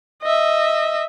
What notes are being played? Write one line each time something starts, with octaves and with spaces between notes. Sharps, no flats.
D#5 E5